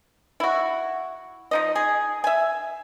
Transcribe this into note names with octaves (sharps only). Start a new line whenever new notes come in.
E4 F#4
F3 D#4 D#5
G#4
E5 G#5